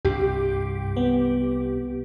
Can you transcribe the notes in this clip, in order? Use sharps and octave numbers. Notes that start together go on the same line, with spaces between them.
C2 G2 G4
B3